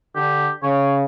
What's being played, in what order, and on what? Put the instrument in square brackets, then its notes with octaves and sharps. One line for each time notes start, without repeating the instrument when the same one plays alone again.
[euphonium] D3 [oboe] G4
[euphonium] C#3 [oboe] C#5